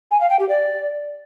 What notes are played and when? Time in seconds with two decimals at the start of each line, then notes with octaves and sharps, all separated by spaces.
0.11 G#5
0.21 F5
0.30 G5
0.39 G4
0.49 D5